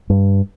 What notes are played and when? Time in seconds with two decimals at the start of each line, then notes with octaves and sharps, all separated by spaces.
0.10 G2